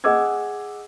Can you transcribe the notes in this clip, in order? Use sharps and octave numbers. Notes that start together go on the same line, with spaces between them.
G#4 D#5 F#5 D6 E6 G#6